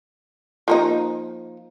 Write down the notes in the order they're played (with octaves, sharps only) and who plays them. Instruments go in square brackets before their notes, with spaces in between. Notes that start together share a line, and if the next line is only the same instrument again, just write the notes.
[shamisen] F3 A#3 D#4